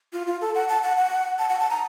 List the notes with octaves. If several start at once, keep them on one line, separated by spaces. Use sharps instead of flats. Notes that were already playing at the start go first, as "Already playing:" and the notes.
F4
F4
A4
F#5
A5
F#5
F#5
A5
F#5
A5
A#5